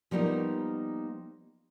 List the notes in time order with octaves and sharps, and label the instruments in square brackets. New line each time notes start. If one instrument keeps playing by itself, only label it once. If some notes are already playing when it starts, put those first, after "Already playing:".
[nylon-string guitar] F3 G3 A#3 B3 D#4